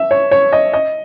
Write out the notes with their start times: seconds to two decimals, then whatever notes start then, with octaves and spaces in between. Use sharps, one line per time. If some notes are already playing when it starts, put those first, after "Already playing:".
Already playing: E5
0.11 C#5
0.31 C#5
0.52 D#5
0.73 D#5